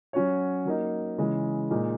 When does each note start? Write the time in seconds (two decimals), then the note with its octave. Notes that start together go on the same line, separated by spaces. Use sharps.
0.13 F#3 C#4 F#4 C#5
0.66 F#3 A#3 D#4
1.18 C#3 E3 G#3
1.71 A#2 G#3 D#4